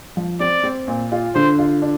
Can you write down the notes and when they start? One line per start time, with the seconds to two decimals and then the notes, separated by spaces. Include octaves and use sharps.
0.17 F3
0.40 C4 D5
0.64 C4
0.88 A#2
1.12 F4
1.35 D3 C5
1.59 F4
1.82 D4